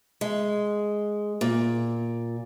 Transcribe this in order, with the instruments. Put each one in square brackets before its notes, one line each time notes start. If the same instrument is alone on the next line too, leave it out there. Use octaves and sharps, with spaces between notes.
[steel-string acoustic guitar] G#3
A#2